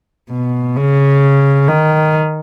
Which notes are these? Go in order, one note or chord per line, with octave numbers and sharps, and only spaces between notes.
B2
C#3
D#3